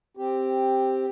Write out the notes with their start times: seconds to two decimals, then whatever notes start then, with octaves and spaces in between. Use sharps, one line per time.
0.17 C4 G4